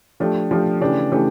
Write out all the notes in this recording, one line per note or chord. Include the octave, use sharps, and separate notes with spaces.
F3 A3 D4 G4
F3 A3 D4 G4
C#3 E3 A3 D4 G4
C#3 E3 A3 D4 G4